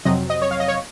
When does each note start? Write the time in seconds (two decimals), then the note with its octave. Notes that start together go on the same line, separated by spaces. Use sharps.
0.05 F2 C3 F#3 C4 D#5
0.30 D#5
0.42 C#5
0.51 F5
0.60 D#5
0.68 C#5